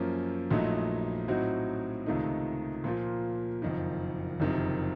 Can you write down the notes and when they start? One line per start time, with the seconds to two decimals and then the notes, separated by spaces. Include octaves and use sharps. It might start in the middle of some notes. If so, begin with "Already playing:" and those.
Already playing: F#2 F3 A#3 C#4
0.50 A#1 A#2 F#3 A3 D#4
1.28 A2 F#3 C4 D#4 F#4
2.06 C#2 C3 D#3 A3 D#4
2.84 A#2 F3 A#3 F4
3.62 F#1 F2 D#3
4.40 F#1 F2 C3 D#3